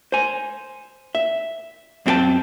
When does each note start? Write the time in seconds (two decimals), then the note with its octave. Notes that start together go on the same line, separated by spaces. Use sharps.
0.12 C5 G#5
1.15 E5
2.06 F#2 C4 F4 G#4 G5 A5